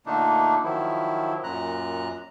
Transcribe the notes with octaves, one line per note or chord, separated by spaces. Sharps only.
A#2 D3 A3 A#3 D4 D#4
D#3 F3 F#3 E4
F#2 A#2 A#5 F#6